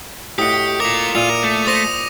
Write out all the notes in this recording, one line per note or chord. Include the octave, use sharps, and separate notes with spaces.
A2 F#4 G4 D#5 D#6 C#7
F4 A#4 D6 F7
A#2 E4 F4 D#7 F7
A#4
A3
C5 D#6 A#6 D#7